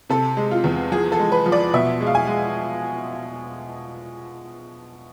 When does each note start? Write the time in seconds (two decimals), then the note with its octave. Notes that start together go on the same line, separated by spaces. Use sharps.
0.10 C3 A4
0.37 G#3
0.51 F4
0.64 E2
0.92 F3 G#4
1.12 A4
1.19 G#3
1.32 B4
1.46 F3
1.52 D5
1.73 B2 E5
2.01 G#3
2.07 F5
2.15 G#5
2.27 G#3